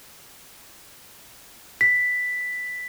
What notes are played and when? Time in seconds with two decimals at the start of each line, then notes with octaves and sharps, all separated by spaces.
1.81 B6